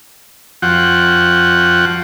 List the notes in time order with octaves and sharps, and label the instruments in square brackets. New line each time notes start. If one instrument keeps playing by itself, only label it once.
[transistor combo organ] F2 F3 F#4 F#5 G5